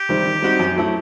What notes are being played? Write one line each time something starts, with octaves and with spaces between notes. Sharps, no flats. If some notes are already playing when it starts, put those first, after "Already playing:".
Already playing: G4
C3 D#3 G3 C4
D#3
G3 C4 D#4 F#4
F#2
F#3 A3 E4